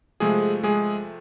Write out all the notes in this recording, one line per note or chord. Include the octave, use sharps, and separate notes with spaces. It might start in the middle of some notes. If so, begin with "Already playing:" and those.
C3 F3 G#3 A3 G#4
G#3 G#4